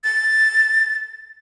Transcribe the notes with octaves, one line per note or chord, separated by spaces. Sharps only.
A6